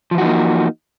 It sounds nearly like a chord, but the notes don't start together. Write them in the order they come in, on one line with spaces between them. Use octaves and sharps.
F3 E3 F#4 D#4 A#3